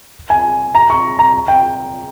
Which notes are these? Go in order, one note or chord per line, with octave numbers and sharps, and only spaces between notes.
G#5
A#5
C#6
A#5
G5